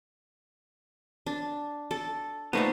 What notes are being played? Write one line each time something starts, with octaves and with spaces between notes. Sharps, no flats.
D4
A4
A#2 A3 B3 D#4 C5